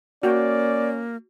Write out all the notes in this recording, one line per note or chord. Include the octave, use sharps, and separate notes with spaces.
A#3 C#4 F#4 D5 G5